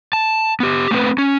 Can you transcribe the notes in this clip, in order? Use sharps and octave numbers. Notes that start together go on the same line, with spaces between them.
A5
B3 G4
A3 C4 B4
C#4